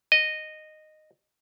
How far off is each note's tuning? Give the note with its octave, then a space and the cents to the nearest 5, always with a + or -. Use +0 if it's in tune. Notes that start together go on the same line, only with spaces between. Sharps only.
D#5 -10